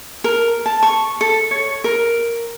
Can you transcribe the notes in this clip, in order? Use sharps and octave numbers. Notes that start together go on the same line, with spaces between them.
A#4
A5
C#6
A4
C#5
A#4